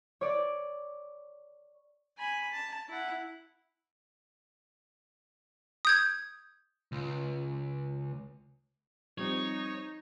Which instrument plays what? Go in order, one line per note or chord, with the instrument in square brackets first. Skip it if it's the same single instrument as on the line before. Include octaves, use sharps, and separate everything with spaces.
[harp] C#5 D5
[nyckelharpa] G#5 B5
A5
E4 F#5
[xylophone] D#6 G6 G#6
[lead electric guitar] C#2
[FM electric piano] F3 G3 C4 [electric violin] D#4 [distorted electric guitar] C#5